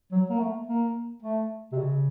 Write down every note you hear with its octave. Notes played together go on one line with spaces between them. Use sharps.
F#3
A#3
A3
A#3
A3
C3
C#3